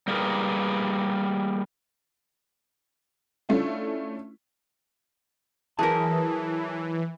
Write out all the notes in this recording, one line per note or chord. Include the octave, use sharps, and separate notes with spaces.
G3 A#3 G4 G#4 A#4 B4
A3 C#4 D4 E4 F4
E3 F#3 G#4 A#4 A5